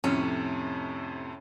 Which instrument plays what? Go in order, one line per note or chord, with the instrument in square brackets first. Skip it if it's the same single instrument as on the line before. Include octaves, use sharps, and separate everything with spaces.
[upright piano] F2 A2 C3 [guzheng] C#4